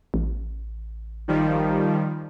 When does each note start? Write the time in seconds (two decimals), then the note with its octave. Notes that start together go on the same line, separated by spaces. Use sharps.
0.14 A1
1.28 D#3 F3 G3